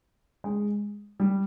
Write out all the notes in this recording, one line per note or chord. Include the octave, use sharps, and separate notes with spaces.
G#3
G3